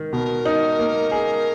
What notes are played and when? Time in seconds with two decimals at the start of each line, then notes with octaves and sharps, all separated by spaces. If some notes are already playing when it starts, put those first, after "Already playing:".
Already playing: D#3
0.13 B2 A#4
0.45 D#4
0.79 A#3
1.11 G#4